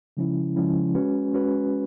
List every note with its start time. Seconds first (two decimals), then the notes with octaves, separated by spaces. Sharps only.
0.17 C#3 F3 G#3 C#4 E4
0.56 C#3 F3 G#3 C#4 E4
0.94 G#3 C#4 F#4 B4
1.33 G#3 C#4 F#4 B4